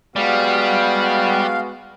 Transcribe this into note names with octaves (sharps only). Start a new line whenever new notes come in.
G3 G#3 B3 F#4 F5